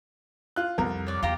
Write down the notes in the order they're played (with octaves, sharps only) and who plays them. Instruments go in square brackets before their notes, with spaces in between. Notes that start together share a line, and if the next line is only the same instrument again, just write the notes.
[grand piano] F4 F#6
[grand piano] C2 A#4 [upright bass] F2
[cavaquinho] C#5 D5
[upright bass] E2 [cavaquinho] F4 G4 A#5